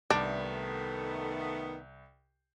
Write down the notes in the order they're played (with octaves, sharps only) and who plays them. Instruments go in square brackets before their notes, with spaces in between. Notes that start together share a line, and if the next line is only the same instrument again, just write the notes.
[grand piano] C2 [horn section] D#3 A3 B3 [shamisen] D4